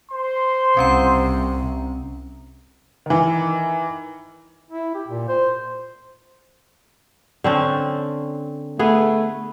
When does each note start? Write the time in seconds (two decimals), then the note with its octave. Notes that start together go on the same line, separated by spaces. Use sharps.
0.11 C5 C6
0.77 C2 C3 C4 C#4 A#5
3.06 D#3 E3
4.70 E4
4.95 G4
5.08 A#2
5.28 C5
7.44 D3 C4 C#4
8.79 A3 B3 G#4